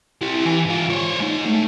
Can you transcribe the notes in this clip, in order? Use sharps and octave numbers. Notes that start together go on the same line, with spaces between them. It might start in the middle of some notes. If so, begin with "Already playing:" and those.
E4 G4
E3 G#5
G#2 F4
C5 C#5
G#3 D#4
A2